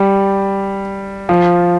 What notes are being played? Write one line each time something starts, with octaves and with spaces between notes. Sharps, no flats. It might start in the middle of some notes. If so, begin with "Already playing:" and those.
Already playing: G3
F3